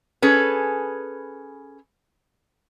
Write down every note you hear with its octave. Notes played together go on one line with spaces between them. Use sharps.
C#4 G#4 A4 B4